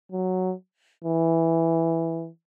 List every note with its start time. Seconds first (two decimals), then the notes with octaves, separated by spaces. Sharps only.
0.12 F#3
1.04 E3